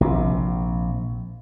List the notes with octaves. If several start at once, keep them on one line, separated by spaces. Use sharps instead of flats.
A#1 C3